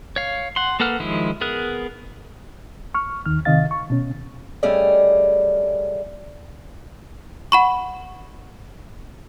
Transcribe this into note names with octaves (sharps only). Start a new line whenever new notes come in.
C#5 F5
F#5 C6
A#3 A4 B4 F#5 F6
D#3 F3 G#3 E4
B3 G#4 A#4 F#6
C#6 F6
D#2 D#3 F6
C3 D#3 D#4 D#5 F5 A6
C#6
B2 C#4
G3 A3 C#4 G#4 D5 D#5
F#5 B5 C#6